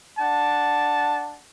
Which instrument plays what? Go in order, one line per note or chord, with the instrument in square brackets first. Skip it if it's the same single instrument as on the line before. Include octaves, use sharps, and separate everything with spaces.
[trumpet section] D4 F#5 A5